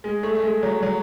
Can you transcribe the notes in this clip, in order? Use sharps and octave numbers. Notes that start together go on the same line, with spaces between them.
G#3
A3
A3
G#3
F#3
F#3